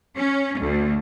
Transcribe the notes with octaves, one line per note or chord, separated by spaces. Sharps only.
C#4
D2